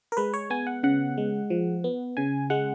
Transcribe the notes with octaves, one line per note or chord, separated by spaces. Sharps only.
A#4
G#3 B4
C#5
B3 G#5
F#5
C#3 F#5
G#3
F3
B3
C#3 G#5
G#3 F#5